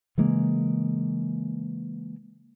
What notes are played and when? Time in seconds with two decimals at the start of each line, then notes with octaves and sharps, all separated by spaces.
0.18 C#3 E3 G#3 A#3